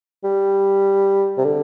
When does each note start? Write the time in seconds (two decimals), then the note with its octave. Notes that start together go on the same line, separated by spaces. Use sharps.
0.24 G3
1.38 C3
1.44 D3